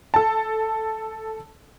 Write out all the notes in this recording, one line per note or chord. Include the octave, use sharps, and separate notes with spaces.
A4 A5